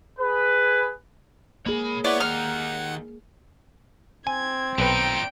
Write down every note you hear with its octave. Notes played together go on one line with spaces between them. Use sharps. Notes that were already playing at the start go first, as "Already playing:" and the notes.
G#4 B4
A#3 G#4 C#5 B5
B3 E4 B4 C#5 D5 F#5
D#2 D#4 F#5 F6
C4 G#5 G#6
B1 A#2 D#4 B4 G5 D7